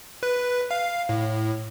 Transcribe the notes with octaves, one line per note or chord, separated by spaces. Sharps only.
B4
F5
A2